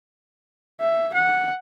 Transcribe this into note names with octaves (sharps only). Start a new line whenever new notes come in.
E5
F#5